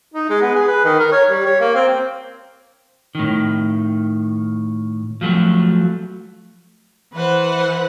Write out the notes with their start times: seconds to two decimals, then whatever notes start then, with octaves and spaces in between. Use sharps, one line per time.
0.14 D#4
0.29 G#3
0.42 B3
0.55 G#4
0.68 B4
0.85 D#3
1.00 A#4
1.12 C#5
1.30 G3
1.46 C#5
1.61 A#3
1.75 C4
3.15 A2 D#3
5.21 F3 F#3 A3
7.14 E3 B4 C5 F#5